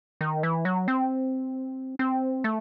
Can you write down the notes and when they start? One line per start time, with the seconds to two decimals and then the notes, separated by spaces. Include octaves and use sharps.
0.21 D#3
0.43 E3
0.65 F#3
0.88 C4
1.99 C4
2.44 A3